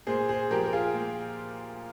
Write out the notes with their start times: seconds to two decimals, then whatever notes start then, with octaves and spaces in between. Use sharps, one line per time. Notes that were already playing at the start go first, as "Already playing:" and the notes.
0.07 A#2 G#4 C5
0.29 G#4 C5
0.51 F3 G4 A#4
0.66 A#4
0.73 F4 G#4
0.94 A#2